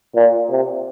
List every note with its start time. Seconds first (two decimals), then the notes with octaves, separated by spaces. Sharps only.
0.16 A#2
0.50 C3